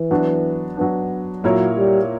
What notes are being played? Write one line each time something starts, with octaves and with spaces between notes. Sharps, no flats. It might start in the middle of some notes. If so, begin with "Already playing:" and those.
Already playing: E3
F#3 B3 D4
F#3 B3 D4
A#2 F#3 A#3 E4 A#4 C#5
G3